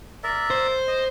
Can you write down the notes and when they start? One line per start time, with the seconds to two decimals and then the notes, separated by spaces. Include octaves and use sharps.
0.24 A#4 D5 E5
0.50 C5
0.87 D#5